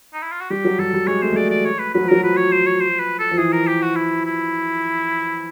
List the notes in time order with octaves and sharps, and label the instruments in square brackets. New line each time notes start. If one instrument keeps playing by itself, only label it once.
[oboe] D#4
E4
F4
F#4
[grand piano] G3 [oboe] G4
[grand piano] F#3
[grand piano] G3 [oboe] A4
[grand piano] G3
[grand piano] G#3 [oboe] C#5
[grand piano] A3 [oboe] C5
[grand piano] A3
[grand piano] G#3 [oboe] D5
[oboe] D5
C#5
B4
[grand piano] F#3 [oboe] B4
[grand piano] F3
[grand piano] F#3 [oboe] A#4
[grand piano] F3 [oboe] B4
[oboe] C#5
C5
C#5
C5
B4
A4
[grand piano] F3
[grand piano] E3 [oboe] G#4
[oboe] A#4
G4
F#4
E4
E4